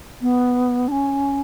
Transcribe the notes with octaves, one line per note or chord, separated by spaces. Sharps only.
B3
D4
C#4